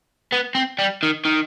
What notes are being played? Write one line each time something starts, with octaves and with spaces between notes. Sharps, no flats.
B3
C4
G3
D#3
D#3